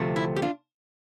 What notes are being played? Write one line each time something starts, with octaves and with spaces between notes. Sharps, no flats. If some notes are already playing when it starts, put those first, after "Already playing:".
Already playing: D2 C3 F3 A3 C4
E4
G4
D4 F4